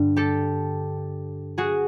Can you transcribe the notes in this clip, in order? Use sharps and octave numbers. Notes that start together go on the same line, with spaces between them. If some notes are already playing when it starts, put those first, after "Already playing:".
Already playing: G2 D3 G3
G4 A4
F#4 G#4